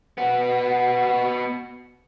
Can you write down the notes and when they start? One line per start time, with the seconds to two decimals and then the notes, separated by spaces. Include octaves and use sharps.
0.18 B3 F#4